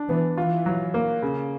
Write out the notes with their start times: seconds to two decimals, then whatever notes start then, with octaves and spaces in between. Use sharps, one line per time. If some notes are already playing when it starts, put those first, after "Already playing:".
Already playing: D4
0.09 E3 B3
0.37 E3 F4
0.66 F#3
0.94 A#3
1.22 C#3